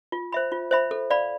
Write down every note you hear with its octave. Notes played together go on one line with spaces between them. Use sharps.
F4
C5 E5 B5
F4
C5 E5 B5
A4
D5 F5 B5